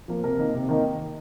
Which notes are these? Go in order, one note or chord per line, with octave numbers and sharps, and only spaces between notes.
F3 A#3
C3 A#4
D#3 A#3 D#4
C3
D#3 A#3 D#4